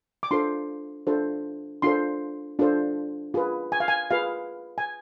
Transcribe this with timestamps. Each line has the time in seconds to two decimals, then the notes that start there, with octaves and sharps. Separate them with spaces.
0.23 D6
0.31 D4 F4 A4 C5 C6
1.07 D4 F4 A4 C5
1.82 D4 F4 A4 C5 C6
2.59 D4 F4 A4 C5
3.34 F4 G#4 B4
3.72 G#5
3.80 F5
3.88 G#5
4.10 F4 G#4 B4 F5
4.78 G#5